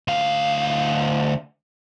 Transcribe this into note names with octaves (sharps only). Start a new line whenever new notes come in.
D2 F5